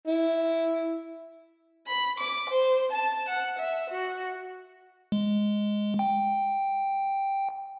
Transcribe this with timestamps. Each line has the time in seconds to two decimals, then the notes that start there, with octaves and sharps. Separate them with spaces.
0.07 E4
1.87 B5
2.20 D6
2.50 C5
2.92 A5
3.29 F#5
3.59 E5
3.90 F#4
5.12 G#3
5.99 G5